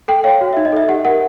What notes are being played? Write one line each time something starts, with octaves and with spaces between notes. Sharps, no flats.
A4 G5
C#5 F5
F#4
E5
D#4
D#5
A4 E5
G4 F#5
A#4 F#5